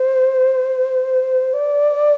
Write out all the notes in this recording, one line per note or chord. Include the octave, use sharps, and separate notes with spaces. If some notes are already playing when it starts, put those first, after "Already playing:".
Already playing: C5
D5